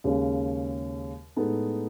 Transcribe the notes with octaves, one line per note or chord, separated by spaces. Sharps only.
D#2 C#3 G#3 C#4
A2 G#3 B3 D#4 A4